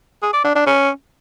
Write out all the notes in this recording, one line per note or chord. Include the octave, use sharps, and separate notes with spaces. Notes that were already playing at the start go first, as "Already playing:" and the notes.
G#4
D5
D4
D4
C#4